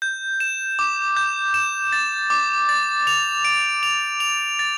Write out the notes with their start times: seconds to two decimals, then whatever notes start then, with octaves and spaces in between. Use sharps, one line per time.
0.02 G6
0.40 E7
0.79 D6
1.16 G6
1.54 E7
1.92 A6
2.30 D6
2.69 A6
3.07 F7
3.45 D7
3.83 F7
4.20 F7
4.59 A6